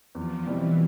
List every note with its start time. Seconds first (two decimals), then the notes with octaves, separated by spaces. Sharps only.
0.15 E2 F3
0.46 B2 E3 G3 C4 E4